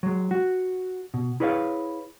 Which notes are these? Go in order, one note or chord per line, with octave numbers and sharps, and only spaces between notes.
F#3 G#3
F#4
B2
E4 G#4 B4 C#5 D5 F5